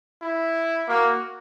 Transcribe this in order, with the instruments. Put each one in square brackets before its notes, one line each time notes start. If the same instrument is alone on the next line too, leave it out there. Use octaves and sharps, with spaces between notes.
[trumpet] E4
[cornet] A#3 [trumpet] F#4